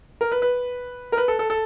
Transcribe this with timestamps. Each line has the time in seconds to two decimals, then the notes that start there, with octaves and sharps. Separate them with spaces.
0.21 A#4
0.32 B4
0.42 B4
1.12 A#4
1.18 B4
1.28 A4
1.39 A4
1.50 A4